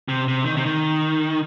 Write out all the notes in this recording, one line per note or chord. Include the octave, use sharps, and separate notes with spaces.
C3
C3
D#3
C3
D#3